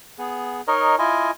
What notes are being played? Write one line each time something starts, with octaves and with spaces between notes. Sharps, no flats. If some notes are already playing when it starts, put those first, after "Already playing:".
B3 G#4
D#4 A#4 C#5 D#5
E4 F4 D#5 G#5